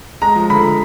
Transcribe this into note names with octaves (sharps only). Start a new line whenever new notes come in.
G#3 A#5
F3
D3 B5